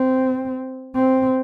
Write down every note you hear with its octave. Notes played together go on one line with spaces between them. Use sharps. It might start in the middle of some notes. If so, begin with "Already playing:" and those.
Already playing: C4
C4